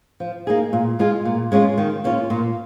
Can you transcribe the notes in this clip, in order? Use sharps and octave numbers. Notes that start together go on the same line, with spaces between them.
F3
A#3 D#4 G#4
A#2
G#3 F4 G#4
A#2
G#3 C#4 F4 G#4
D#3
A#3 C#4 F4
A#2